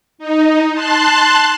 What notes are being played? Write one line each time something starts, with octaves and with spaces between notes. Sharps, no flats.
D#4
A5 C6 F#6